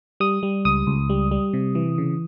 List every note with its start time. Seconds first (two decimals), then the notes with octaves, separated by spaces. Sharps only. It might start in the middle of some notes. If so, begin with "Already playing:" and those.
0.20 G3 D#6
0.43 G3
0.65 C#2 D#6
0.87 C#2
1.10 G3
1.31 G3
1.54 C3
1.75 E3
1.98 C#3